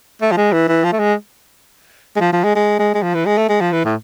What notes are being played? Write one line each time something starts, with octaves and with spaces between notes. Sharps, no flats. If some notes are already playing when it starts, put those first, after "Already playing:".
A3
F3
G#3
E3
E3
F3
A3
G#3
G#3
F3
F3
G#3
G#3
G#3
G#3
F3
E3
G#3
A3
G#3
F3
E3
A2